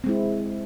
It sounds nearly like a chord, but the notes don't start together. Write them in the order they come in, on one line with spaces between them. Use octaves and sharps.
C4 G#3 E4